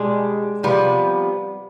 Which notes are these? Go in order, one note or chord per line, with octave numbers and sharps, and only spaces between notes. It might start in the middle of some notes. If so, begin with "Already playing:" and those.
Already playing: B2 G3 G#3 D4
C3 F3 G3 B3